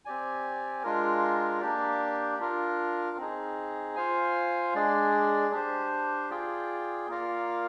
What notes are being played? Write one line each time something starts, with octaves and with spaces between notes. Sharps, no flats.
C4 G4 D5 G#5
G#3 D4 F4 A#4
A#3 D4 G4 D5
D4 F4 A#4
C4 D#4 G#4
F4 C5 F5 G#5
G#3 D4 G#4 D5
D4 G4 C5
F4 G#4 D5 G5
A#3 F4 A#4 D5 F5